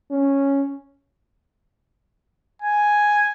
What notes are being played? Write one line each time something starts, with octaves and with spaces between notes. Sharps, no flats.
C#4
G#5